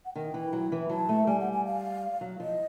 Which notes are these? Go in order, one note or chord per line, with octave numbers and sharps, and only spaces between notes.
F#5
D#3 G5
E3
F#3
E3
F#3 A5
A3
G3 G#5
F#5
G#5
F5
F#3
F3 D#5